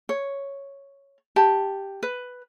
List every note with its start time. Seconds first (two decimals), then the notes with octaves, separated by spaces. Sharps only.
0.09 C#5
1.36 G4 A5
2.03 B4